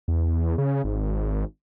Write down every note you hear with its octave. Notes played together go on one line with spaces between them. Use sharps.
E2
C#3
G#1